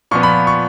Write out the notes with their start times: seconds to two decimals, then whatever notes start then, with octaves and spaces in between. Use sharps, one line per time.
0.11 A#2 F3 B3 C#6
0.23 B5
0.47 C#6